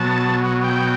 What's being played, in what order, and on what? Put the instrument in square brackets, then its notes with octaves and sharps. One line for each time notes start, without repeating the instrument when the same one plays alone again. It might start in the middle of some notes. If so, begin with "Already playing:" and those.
Already playing: [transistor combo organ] B2 F#3 A5
G5